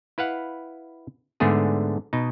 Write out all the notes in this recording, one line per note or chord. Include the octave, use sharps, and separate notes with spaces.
E4 B4 F5 F#5
G#2 D3 A3 B3 D4 G#4
B2 D#4